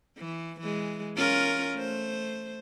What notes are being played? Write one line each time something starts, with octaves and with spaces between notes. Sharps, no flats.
E3
E3 G#3
C#4 F4 A#4
A3 C5